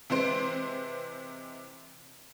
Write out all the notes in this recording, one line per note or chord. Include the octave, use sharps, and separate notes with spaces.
C3 E3 G#3 C5 D7